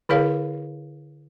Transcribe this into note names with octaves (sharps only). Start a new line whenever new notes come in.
D3 E4 G#4 A#4 C#5 F5